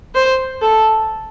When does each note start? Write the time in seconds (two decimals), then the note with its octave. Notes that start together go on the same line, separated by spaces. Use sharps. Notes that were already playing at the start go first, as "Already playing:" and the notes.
0.15 C5
0.62 A4